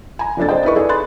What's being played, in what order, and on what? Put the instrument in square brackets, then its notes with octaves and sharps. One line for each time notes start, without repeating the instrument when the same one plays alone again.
[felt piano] G#5 A#5
F#1 F2 D4 A4 A6
G#4 C5 D5 D#5 G5
D#4 E4 A#4 B4 D#5 C#6
D#4 G#4 A4 D5
B5 C6 F#6 A6